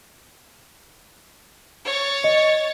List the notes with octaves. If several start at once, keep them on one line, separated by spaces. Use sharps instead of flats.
C#5 A6
D#5 C#7